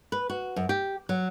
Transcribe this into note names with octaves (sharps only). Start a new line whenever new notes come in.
B4
F#4
F#2
G4
F#3